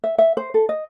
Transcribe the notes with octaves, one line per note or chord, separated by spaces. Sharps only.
E5
E5
C5
A4
D#5